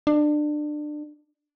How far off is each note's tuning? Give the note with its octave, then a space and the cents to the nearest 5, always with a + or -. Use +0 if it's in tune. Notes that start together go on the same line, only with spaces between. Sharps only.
D4 +25